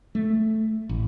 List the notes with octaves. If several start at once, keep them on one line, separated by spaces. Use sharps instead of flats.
A3
A1